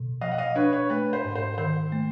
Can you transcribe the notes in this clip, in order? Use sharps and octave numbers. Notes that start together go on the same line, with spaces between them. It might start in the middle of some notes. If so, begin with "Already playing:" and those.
Already playing: B2
F3 D#5 F5
F#5
D#5 F5
D4 B4 C#5
B4 C#5
A3 B4
C5
G#2
C5
D#3 C5
A3